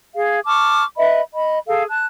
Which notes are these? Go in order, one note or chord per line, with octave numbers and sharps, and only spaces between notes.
G#4 F5
A5 C#6 D6 F6
B4 D#5 E5 B5
D#5 B5
G#4 A4 F5
A5 F#6